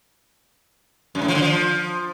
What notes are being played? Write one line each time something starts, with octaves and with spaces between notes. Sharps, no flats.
F#2
A2
F3
D3
F3